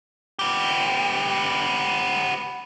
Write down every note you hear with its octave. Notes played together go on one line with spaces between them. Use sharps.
B3 G4